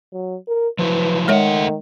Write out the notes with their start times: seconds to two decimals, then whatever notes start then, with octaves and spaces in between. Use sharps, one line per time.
0.13 F#3
0.48 A#4
0.79 F3 F#3 E4 B4
1.28 D#3 G#3 A3 C#5 E5 F#5